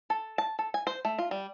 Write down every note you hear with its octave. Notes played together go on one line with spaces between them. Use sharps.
A4
A5
A4
G#5
C5
A3
F4
G3